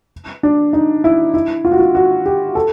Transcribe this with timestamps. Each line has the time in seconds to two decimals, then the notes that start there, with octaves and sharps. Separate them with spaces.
0.43 D4
0.73 D#4
1.04 E4
1.34 E4
1.65 F4
1.71 F#4
1.79 F4
1.95 F#4
2.26 G4
2.55 A4